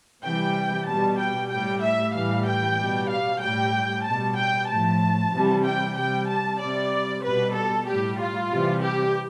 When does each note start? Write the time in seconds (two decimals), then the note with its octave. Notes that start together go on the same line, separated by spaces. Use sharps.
0.24 C3 E3 G3 G5
0.88 B2 G3 A5
1.19 G5
1.51 A2 G3 G5
1.82 E5
2.14 A2 E3 G3 F5
2.47 G5
2.78 B2 G3
3.10 F5
3.42 A2 G3 G5
4.05 B2 G3 A5
4.38 G5
4.70 A2 F3 A5
5.33 C3 E3 G3
5.64 G5
5.97 C3 G3 G5
6.29 A5
6.61 C3 G3 D5
7.24 B2 G3 B4
7.55 A4
7.87 A2 G3 G4
8.19 F4
8.51 C3 E3 G3
8.83 G4